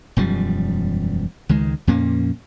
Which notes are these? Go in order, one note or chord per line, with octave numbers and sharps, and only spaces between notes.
E1 F#2 F3 G3
C#2 D#3 G#3
F2 A#2 A#3 C#4